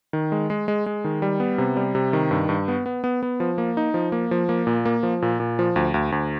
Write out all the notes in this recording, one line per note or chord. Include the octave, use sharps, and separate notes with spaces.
D#3
G#3
G#3
G#3
G#3
D#3
G3
B3
C3
G3
C3
D#3
G2
G2
B3
B3
B3
B3
F3
A#3
D#4
F3
A#3
F3
A#3
A#2
A#3
F3
A#2
A#2
F3
D2
D2
D2